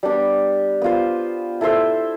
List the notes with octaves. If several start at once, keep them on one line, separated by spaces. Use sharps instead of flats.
G3 B3 D4 G4
B3 F4 C5
E4 A4 C5 E5